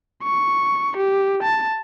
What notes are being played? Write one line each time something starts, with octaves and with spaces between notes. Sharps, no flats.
C#6
G4
A5